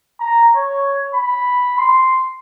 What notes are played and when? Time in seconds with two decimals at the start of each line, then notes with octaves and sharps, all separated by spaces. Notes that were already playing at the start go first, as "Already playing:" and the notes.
0.20 A#5
0.55 C#5
1.14 B5
1.78 C6